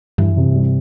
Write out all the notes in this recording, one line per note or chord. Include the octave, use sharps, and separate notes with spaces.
G2 E3
F#2
C3
G2
G3